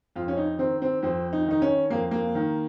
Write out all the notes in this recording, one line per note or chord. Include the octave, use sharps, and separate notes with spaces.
F2 F4
C#4
D#4
D#3 C4
C4
F2 C4
D#4
D#3 D#4
C#4
F2 A#3
A#3
D#3